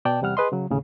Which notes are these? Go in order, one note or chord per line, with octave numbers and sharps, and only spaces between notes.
B2 D5 G5 A5
E2 C3 G3 F#5 F6
G#4 B4 D#5 C6
C#3 F#3
D#2 A2 C#3